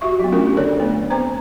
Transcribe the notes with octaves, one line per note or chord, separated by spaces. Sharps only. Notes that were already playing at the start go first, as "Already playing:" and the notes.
F#4 G4 E5 C#6
F#3 B3
A3 C#4 D4 F4 G4 A#4
D3 D4 A4 C#5 D5
A3 B3 B4
B3 C4 C5 A#5